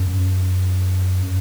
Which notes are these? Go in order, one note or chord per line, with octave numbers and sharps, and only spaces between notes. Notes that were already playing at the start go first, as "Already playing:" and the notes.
Already playing: F#2